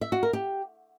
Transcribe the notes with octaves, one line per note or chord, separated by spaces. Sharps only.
E5
F#4
A#4
G4